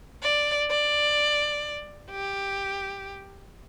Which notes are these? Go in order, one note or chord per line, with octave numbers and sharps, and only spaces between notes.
D5
D5
G4